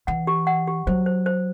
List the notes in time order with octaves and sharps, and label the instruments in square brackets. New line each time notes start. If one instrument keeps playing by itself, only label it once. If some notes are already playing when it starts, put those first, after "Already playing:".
[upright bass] E3 [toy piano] F#5
[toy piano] G4
F#5
G4
[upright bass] F#3 [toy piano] C5
[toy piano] C5
C5